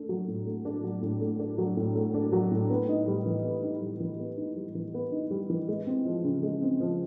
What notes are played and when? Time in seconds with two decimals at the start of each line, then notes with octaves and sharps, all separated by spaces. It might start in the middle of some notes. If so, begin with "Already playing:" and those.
Already playing: A3 D4
0.09 F#3
0.28 A2
0.46 A3
0.65 D4
0.83 F#3
1.02 A2
1.21 A3
1.40 D4
1.58 F#3
1.77 A2
1.96 A3
2.14 D4
2.32 F#3
2.51 A2
2.70 B3
2.89 D#4
3.08 G3
3.26 E3
3.44 B3
3.63 D#4
3.82 G3
4.00 E3
4.19 B3
4.38 D#4
4.56 G3
4.75 E3
4.94 B3
5.12 D#4
5.31 G3
5.50 E3
5.68 G#3
5.87 C4
6.05 F3
6.24 C#3
6.43 G#3
6.62 C4
6.80 F3